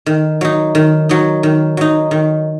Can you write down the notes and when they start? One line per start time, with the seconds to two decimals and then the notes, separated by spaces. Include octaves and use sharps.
0.06 D#3
0.41 F#3 D#4
0.75 D#3
1.09 F#3 D#4
1.43 D#3
1.77 F#3 D#4
2.11 D#3